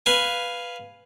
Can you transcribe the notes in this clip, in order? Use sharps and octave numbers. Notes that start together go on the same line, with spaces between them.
B4 F5 G#5